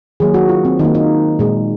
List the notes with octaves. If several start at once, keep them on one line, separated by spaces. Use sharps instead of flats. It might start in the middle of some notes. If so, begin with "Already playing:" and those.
D#3 F#3 A#3 G#4
F#4
F4
C4
D#3 A#3 D#4
D#4
A#2 G#3